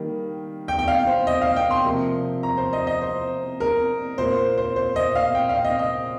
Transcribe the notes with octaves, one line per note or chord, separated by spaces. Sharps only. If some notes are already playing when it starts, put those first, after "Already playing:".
Already playing: D#3 G3 A#3
G5
G5
F5
C5
D#5
F5
G5
C6
C3 F3 A#3
A#5
C5
D#5
D#5
C5
A#4
A#2 A#3 C5
C5
C5
D#5
F5
G5
F5
D#5
D#5